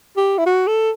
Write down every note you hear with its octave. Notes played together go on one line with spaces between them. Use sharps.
G4
E4
F#4
A4